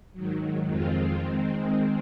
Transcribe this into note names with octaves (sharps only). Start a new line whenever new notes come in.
G#2 D#3 F#3
F2 D#3 G#3 C4 F4
D#3 G#3 C4